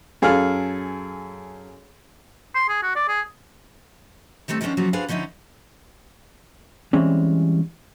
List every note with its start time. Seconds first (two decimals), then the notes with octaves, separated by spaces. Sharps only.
0.22 F#2 G#4 A4 F5 F6
2.55 C6
2.69 G#4
2.83 F#4
2.96 D5
3.08 G#4
4.48 D#3 G3 A3 C4
4.61 D#3 F3 G#3 B3 C#4 D4
4.77 C#3 F3 F#3 A#3 B3
4.93 D4 F#4 G#4 B4 C5 F5
5.08 D3 F3 C#4 D#4 E4
6.93 E3 G3 G#3 C4 C#4